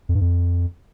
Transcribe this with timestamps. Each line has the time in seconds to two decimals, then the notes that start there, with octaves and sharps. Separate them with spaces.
0.09 F2
0.15 G2
0.21 F2